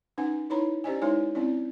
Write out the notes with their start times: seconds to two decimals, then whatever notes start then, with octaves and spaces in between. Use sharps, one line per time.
0.18 C#4 D#4 B4 F#5 G#5
0.50 D#4 E4 B4 C#5 A#5 B5
0.84 C#4 G4 C5 D5 D#5 G#5
1.02 G#3 D#4 E4 B4 C#5 G#5
1.35 C4 C#4 E4 D5